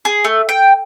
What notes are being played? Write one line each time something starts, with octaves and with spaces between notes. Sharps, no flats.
G#4
A3
G5